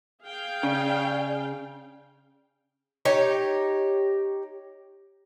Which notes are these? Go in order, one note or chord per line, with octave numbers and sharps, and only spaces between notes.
G#4 F5 G5
C#3 D5
D#4 G4 C#5